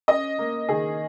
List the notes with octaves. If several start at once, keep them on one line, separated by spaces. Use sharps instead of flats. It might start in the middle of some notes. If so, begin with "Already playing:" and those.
C#4 D#5
A#3
D#3 G#4